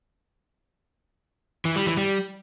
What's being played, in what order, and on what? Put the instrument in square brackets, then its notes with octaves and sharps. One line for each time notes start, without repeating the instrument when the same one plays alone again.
[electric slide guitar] E3
G3
E3
G3